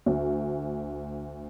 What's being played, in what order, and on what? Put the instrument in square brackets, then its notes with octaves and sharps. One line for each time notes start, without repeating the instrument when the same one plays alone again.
[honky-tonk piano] D2